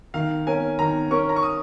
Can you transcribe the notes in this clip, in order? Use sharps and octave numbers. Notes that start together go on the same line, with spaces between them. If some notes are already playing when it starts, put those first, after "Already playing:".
D#3 F5
C#4 A#4 G#5
D#3 A#5
C#4 A#4 C#6
A#5
C#6
D#6